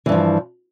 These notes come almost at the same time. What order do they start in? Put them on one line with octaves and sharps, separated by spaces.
E3 G2 F3